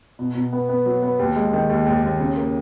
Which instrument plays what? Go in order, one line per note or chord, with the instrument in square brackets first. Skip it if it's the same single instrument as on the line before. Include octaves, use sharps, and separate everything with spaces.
[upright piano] B2
B2
B3
B3
F#3
B3
D#2
G#3
D#3
D#2
D#2
D#2
C#3
A#3